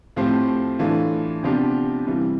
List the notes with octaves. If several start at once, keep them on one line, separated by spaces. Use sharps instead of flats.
A2 F3 A3 C4 G4
A2 E3 A3 D4 F4
C3 F3 B3 D4 G4
C3 E3 G3